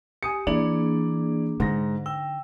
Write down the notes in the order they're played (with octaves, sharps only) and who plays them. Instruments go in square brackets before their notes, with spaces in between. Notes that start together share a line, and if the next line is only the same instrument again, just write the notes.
[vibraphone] G4 [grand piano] G#5 D#6 C#7
[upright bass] E3 [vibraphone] A#3 D4 G#4 [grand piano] E4 D5 F#7
[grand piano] G#2 A#6 [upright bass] D3 D#4
[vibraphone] G5 [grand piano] E6